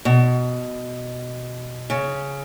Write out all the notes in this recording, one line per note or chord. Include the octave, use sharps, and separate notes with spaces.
B2
C#3